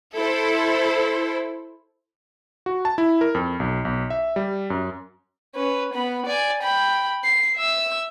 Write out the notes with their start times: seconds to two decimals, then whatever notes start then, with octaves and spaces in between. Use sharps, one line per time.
0.15 E4 A4 C5
2.66 F#4
2.85 A5
2.98 E4
3.21 A#4
3.35 F2
3.60 B1
3.85 B1
4.10 E5
4.36 G3
4.70 F#2
5.55 C#4 B4
5.94 B3 B5
6.26 D5 G#5
6.63 G5 B5
7.24 C7
7.55 E5 E6